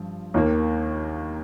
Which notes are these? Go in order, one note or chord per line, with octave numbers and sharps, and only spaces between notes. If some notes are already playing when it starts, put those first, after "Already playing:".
Already playing: G2 F3
D#2 D#3 A#3